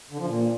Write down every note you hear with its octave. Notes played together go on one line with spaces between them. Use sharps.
D3
F3
A#2